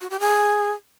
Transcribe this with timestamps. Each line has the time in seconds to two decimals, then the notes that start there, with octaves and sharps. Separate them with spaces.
0.01 F#4
0.10 G4
0.20 G#4